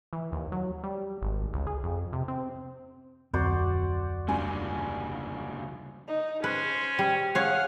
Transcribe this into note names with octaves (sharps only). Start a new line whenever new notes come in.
E3
D#2
F#3
G3
G#1
C#2
G#4
F2
C3
C4
D1 F2 C4 F#4 C5 D5
G2 C#3 F3 A#3 G#5
D#4
C#4 B4 C5
G3
G#4 C#5 F5 F#5 F6